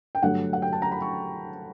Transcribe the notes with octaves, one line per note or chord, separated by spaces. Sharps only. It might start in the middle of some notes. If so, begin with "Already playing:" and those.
G5
G2 D3 F#3 A3 F#5
F#5
G5
A5
A#5
B5
C#6